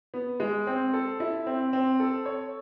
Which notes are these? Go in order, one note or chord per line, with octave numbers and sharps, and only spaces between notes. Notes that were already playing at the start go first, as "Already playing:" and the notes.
B3
G#3
C4
A4
E4
C4
C4
A4
C#5